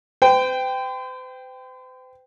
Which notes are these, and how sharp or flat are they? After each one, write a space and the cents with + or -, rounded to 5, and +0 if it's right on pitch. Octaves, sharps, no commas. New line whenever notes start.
C5 -45 G5 +0